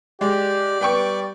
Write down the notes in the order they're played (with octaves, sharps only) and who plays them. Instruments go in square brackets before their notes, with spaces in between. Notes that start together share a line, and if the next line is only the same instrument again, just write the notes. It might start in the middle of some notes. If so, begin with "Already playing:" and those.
[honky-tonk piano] G#3 [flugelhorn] G4 [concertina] D5
[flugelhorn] G3 [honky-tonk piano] B3 G5 C#6